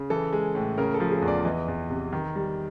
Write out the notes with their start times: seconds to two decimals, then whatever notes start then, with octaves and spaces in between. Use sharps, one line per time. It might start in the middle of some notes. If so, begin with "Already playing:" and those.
Already playing: C#3
0.10 E3 A4
0.33 G#3
0.55 A2
0.78 C#3 A#4
0.94 A4
1.00 F3
1.11 G#4
1.22 E2
1.28 D5
1.45 E3 D#5
1.68 E2
1.90 C3
2.12 D#3
2.35 G3